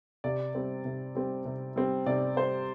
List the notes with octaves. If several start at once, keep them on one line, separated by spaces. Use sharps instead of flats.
C3 D5
G3 C4
C3
G3 C4
C3
G3 C4
C3 D5
G3 C4 C5